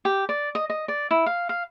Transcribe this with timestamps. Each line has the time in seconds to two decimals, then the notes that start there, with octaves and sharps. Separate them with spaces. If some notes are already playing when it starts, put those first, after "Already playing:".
0.05 G4
0.29 D5
0.55 D#5
0.70 D#5
0.88 D5
1.11 E4
1.26 F5
1.49 F5